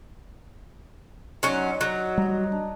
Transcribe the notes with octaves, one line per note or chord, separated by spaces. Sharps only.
F#3 C#4 D#4 D5 C6
F#3
G3 D#5 A#5
D4